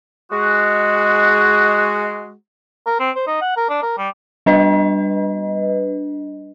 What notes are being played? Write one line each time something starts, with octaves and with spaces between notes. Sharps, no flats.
G#3 F#4
A#4
C4
C5
D#4
F#5
A#4
D4
A#4
G3
G3 D4 B4 D#5